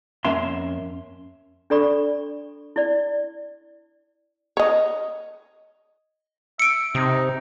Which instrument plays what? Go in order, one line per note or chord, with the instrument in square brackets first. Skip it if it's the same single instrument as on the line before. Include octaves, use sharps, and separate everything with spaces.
[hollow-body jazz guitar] F2 A#3 C#4 E5 C6
[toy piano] D4 A4 D5 B5 C#6
E4 D5
[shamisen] C#5 D#5
[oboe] E5 [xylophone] C#7 D7
[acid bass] C3 [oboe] D#4